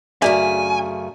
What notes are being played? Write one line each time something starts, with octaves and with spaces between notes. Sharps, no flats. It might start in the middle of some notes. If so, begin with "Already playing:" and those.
F#2 C#3 A3 D4 G#4 D5 E5 G#5